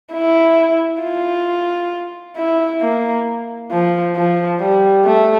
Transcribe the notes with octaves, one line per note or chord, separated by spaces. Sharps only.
E4
F4
E4
A#3
F3
F3
G3
A3